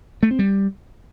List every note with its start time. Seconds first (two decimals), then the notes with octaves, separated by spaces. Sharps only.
0.23 A3
0.31 C4
0.39 G3